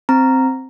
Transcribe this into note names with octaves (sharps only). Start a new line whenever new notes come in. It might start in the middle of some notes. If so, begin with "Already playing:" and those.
C4 A#5